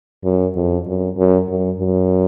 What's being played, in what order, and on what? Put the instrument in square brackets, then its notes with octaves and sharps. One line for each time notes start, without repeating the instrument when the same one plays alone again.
[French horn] F#2
F2
F#2
F#2
F#2
F#2